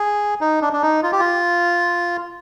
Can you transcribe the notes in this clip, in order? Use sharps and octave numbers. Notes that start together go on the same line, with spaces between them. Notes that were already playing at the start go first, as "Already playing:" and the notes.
Already playing: G#4
D#4
D4
D4
D#4
F4
G4
F4